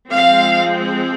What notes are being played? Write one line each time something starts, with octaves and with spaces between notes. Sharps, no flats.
F3 G#3 C4 F5